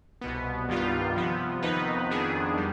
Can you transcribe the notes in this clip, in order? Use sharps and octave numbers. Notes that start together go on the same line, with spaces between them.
C2 B2 B3
G2 D#3 G3 B3 F4
C3 F3 B3
F2 D#3 B3 D#4 B4
F2 D#3 B3 D4 G#4
D#3 G3